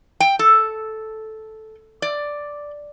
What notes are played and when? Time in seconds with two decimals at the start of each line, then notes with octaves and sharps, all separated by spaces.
0.20 G5
0.39 A4
2.02 D5